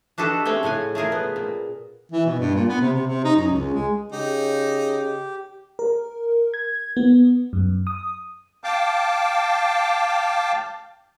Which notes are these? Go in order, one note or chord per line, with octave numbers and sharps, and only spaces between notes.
D4 F#4 G4 A4 B4 D#5
G#3 A3 C4 C#4 G5
A2 C#3 F#5 G#5
A3 F4 G#4 A#4
B3
A#2
E3
B2
G2
A#2
B3
C3
C3
C3
D#4
F#2
C#2
G#3
C#3 D#4 G4
A#4
G#6
B3
F#2
D#6
F5 G5 A5 D6